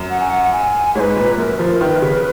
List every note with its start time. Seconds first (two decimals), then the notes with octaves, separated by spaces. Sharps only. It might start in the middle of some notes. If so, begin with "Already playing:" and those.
Already playing: F#2
0.10 F#5
0.20 G#5
0.30 F#5
0.44 F#5
0.53 G#5
0.95 G#2 C#5
1.00 B4
1.17 A#2
1.38 F#2 A#4
1.59 F3
1.72 A#4
1.81 D#3 B4
2.02 C#3